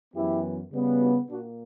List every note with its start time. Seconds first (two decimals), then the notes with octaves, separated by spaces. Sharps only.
0.14 F#2 E3 B3 E4 G4
0.71 C#3 G3 B3
1.01 D4 F#4
1.30 A#2 A#3 D4 F#4